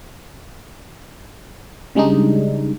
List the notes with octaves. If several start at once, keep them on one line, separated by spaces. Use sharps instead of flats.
C#3 G3 G#3 D4 D#4